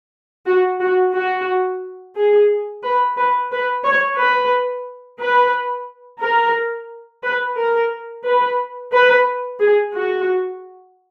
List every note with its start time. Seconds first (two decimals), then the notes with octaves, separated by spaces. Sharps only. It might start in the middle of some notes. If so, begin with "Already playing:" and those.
0.45 F#4
0.80 F#4
1.13 F#4
2.16 G#4
2.82 B4
3.17 B4
3.51 B4
3.85 C#5
4.18 B4
5.19 B4
6.21 A#4
7.23 B4
7.57 A#4
8.24 B4
8.92 B4
9.60 G#4
9.94 F#4